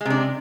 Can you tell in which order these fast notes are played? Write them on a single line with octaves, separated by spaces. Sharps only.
G#3 C3 D4